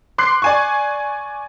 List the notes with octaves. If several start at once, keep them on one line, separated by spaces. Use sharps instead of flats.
C6 D6 F#6 C7
D5 G#5 C#6